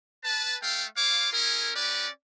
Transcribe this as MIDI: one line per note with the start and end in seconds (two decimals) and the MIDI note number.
0.24 0.56 71
0.24 0.56 81
0.62 0.85 57
0.62 0.85 69
0.62 0.85 77
0.62 0.85 79
0.97 1.28 65
0.97 1.28 73
0.97 1.28 77
0.97 1.28 86
1.33 1.70 61
1.33 1.70 64
1.33 1.70 68
1.33 1.70 70
1.75 2.07 61
1.75 2.07 67
1.75 2.07 71
1.75 2.07 74